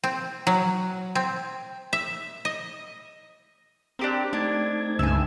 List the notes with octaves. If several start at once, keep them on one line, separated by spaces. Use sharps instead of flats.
C4
F#3
C4
E5
D#5
C4 D4 G4 A#4
A3 D4 D#4 G#6
C#2 G2 E5 G#5